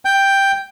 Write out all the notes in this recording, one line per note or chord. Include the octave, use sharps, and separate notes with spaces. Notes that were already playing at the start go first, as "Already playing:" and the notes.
G5